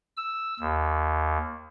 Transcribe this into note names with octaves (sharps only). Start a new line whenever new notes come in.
E6
D#2